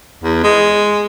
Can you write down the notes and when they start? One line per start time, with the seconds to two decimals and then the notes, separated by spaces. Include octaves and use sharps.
0.24 E2
0.44 G#3